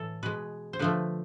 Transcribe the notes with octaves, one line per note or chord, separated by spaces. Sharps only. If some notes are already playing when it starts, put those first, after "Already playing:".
Already playing: A2 E3 A4
B2 G#3 B4
C5
D3 F3 A3 B4